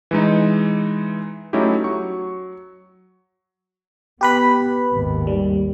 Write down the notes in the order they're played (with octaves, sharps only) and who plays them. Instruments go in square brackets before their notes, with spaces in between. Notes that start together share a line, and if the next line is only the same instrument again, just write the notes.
[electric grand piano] E3 G#3 D#4
F#3 A3 C#4 D#4 E4 G4
F#3 C#6
[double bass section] B3 [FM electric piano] G4 B4 B5
[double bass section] G#1 D#2
[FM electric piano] G3